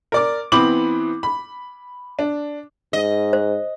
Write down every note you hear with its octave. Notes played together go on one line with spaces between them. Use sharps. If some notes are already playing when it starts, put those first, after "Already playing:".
A#4 D5 D6
E3 B3 C4 B5 D6 F#7
B5
D4
G#2 D#5
C5